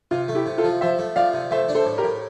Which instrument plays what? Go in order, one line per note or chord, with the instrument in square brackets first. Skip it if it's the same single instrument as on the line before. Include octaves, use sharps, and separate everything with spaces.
[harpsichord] C3 [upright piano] F4
[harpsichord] A3
[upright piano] E4 G4
[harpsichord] C3
[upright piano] F4 A4
[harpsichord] F3
[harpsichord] F3 [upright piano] C5 E5
[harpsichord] A3
[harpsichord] F3 [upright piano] D5 F5
[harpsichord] C3
[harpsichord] A3 [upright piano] C5 E5
[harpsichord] D4
[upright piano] A4 C5
[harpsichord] A2
[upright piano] G4 A#4
[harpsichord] A2